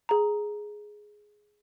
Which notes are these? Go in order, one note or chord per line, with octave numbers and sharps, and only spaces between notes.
G#4 A#5